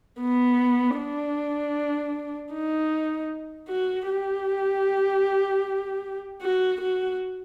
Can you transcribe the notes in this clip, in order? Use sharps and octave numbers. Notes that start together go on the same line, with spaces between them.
B3
D4
D#4
F#4
G4
F#4
F#4